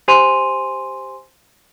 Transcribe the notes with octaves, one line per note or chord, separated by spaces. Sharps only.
G4 C5 G#5 C6 D#7 F7